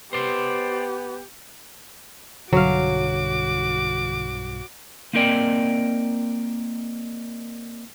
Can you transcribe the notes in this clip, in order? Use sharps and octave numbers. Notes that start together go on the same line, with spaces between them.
B3 G4 C5 D5 C6
B1 G2 D3 F#3 F#4 F5 D6
A#3 C4 D#4 A#4 D5 G5